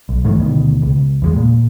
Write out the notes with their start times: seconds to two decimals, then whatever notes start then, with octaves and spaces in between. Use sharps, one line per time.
0.09 B1
0.25 G#2 D#3 E3 A3
0.38 D2 B2 D#3
0.82 C#2
1.22 E2 F3 G#3
1.36 A#2